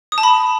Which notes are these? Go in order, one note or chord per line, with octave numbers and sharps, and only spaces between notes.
D#6
A5
B5